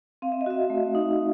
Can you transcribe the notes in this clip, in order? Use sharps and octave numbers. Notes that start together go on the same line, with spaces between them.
C4 F5
E5
D#5
F#4 E5
A3
D#4